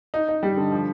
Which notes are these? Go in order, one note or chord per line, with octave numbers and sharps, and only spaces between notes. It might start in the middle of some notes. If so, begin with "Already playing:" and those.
D#4
D#4
G3
D3
F3